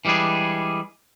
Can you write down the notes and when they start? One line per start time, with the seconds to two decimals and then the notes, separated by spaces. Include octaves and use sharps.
0.05 E3 G3 G#3 D4 G#4